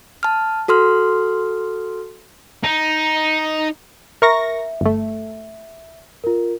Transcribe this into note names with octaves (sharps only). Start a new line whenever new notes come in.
A5 F6
F#4 A4 C6 F6
D#4
A#4 E5 C#6 A#6
G1 A3
F4 A#4